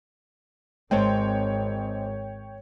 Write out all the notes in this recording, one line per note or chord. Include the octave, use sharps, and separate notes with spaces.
G#1 G#3 C4 C#5 G5 A5